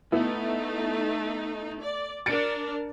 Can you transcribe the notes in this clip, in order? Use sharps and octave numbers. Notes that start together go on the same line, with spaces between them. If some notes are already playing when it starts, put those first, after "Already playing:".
A3 B3 D#4 E4
D5
D4 A#4 A6 C#7 D7